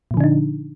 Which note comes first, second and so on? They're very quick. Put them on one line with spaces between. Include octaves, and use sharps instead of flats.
A#2 F3 D3 D4 D#4